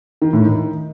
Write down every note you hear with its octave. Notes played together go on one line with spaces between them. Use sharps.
D#3
A2
D#3